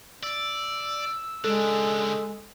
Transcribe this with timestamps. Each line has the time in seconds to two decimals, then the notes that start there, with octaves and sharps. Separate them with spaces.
0.23 D5 E6
1.44 C#3 G#3 D4 A4